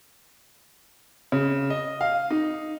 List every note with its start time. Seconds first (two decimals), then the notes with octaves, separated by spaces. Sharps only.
1.32 C#3
1.70 D#5
2.01 F5
2.30 D#4